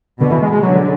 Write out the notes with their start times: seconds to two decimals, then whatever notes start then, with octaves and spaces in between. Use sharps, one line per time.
0.21 B2 D3
0.31 E3
0.42 G#3
0.52 G#3
0.62 D3 F#3